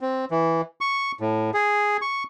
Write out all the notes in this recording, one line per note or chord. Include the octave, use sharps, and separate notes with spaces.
C4
E3
C#6
A2
G#4
C#6